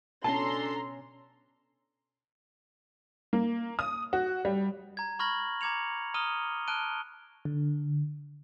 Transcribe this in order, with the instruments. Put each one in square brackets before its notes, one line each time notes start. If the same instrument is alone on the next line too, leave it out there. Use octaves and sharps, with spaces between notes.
[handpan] B2 C#4 [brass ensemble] D4 A4 [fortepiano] A5 [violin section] A#5 C6
[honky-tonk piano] A#3
D#6
F#4
G3
[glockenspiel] A#5 G#6
B5 C#6 F6 G#6 A#6 F#7
A#5 D6 G#6 C#7 F7
A#5 D#6 F6 D#7 G7
A5 F6 F#6 D7 D#7 G7
[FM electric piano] D3